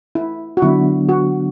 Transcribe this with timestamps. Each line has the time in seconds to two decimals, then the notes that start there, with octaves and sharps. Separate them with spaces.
0.15 E4
0.57 F#4
0.62 D3 F#3 B3 D4 E4
1.09 F#4